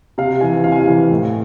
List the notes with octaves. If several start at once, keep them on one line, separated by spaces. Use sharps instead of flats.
C3 F5
E3 G#5
C3 F5
G#5
F5
E3
A2